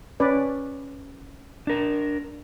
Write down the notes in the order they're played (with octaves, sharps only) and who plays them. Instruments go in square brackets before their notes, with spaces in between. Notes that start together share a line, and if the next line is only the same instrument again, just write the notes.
[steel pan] C#4 B4 D5
[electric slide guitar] D4 A#4